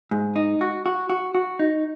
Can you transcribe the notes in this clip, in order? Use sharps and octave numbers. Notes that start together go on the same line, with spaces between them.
G#2
D#4
F#4
F#4
F#4
F#4
D#4